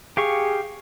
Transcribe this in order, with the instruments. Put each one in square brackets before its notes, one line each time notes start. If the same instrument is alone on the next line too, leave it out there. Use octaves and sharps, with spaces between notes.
[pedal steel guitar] G4 F5 C#6 [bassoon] G#4